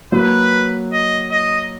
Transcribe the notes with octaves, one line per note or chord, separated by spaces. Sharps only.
F#3 A#3 B4
D#5
D#5